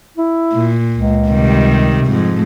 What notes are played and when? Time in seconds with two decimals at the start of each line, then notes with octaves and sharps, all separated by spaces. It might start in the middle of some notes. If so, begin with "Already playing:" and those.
0.18 E4
0.53 A#2
0.92 C#2
1.28 C3 D#3 G3
2.07 F2 G#2